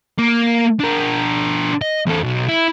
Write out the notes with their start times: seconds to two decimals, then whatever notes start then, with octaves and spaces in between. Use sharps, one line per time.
0.19 A#3
0.80 D4 A#4
1.81 D#5
2.06 E2 A4
2.23 B1
2.48 E4